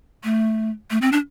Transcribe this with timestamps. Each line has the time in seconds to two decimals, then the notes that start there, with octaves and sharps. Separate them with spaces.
0.24 A3
0.91 A3
1.02 C4
1.12 D4